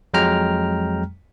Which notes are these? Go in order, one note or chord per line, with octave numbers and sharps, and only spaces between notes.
F2 F#3 G#3 G5 A#5 F6